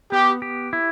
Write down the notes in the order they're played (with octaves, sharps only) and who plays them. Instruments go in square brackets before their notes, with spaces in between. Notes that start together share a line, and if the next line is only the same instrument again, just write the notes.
[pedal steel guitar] B3 [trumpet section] G4
[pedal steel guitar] G4
E4